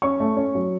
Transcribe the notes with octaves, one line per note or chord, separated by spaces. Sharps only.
C#4 C#6
A3
C#4
F#3